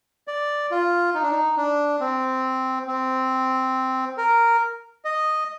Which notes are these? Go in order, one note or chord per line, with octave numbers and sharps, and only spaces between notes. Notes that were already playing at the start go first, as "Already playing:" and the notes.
D5
F4
D#4
D4
D#4
D4
C4
C4
A#4
D#5